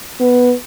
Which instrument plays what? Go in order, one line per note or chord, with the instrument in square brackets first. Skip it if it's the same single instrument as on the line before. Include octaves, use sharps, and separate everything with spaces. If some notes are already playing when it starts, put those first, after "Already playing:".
[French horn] B3